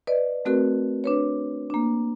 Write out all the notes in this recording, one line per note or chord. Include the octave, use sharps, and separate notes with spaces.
B4 D5 D#5
A3 C4 F#4 A#4 B4
D4 B4 C#5
A#3 D4